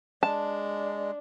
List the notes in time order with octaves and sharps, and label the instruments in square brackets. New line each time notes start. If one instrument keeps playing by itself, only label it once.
[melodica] G#3 [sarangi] D4 [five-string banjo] A5